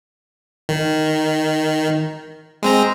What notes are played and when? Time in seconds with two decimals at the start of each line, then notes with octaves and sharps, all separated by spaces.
0.69 D#3
2.63 G#3 C4 A#5